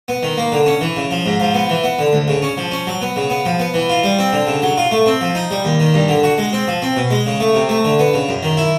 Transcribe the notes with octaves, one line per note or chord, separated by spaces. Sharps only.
B3
D#3
A#3
D3
C#4
E3
C#3
F3
G#2
F3
B3
E3
B3
D3
D2
C#3
C#4
F3
C#4
F#3
B3
C#3
B3
F3
B3
E3
F4
G3
C4
D3
C#3
F#3
F4
A3
C4
F3
D#4
G3
D#2
D#3
G2
D3
F#4
G#3
C4
F3
C4
B2
G#3
C#3
A3
C3
A3
D3
B3
C#3
F#2
D#3
E4